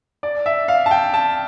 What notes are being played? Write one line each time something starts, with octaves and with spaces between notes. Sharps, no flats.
D5
E5
F5
A5
G5
A5